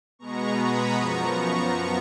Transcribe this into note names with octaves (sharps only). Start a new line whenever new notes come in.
B2 G#3 B3 A#5 C#6
B5 D#6
F#2 F3 B3 A#5 C#6